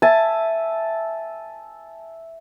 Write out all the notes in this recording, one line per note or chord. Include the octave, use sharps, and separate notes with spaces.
E5 G#5 A5